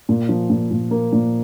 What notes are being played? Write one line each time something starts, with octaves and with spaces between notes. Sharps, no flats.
A#2
F3
A#2
A#2
A#3
A#2